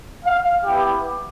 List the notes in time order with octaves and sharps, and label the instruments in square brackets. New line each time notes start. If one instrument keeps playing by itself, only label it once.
[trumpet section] F5
B3 E4 G4 G5